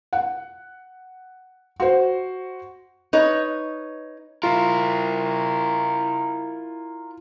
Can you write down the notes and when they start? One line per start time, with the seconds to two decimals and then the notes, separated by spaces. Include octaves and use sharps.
0.13 F#5
1.80 F#4 C5
3.13 D#4 B4 C#5
4.43 E4 F4 A#4